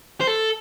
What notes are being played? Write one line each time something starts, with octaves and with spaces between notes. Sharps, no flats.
C5
A4